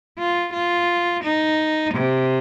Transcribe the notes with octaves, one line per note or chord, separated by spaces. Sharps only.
F4
F4
D#4
C3